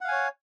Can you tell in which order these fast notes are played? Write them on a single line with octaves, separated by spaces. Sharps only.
F#5 F5 G#5 C#5